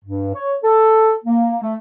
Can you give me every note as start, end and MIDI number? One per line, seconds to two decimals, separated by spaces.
0.03 0.30 43
0.34 0.55 73
0.63 1.13 69
1.24 1.57 58
1.62 1.74 57